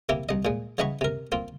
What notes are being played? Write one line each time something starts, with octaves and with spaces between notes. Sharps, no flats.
C3 A#3 E4 G4
C2 D#5
A#2 G#3
C#3 E3 D#5 F#5 B5 C#6
C3 A#4
A#3 C4 F4